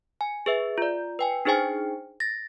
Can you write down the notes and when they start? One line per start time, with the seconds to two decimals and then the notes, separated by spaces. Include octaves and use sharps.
0.21 G#5
0.46 G#4 B4 E5
0.78 F4 D5
1.19 B4 G5 G#5
1.45 D4 D#4 G#4 C5 G5 G#5
2.20 A6 A#6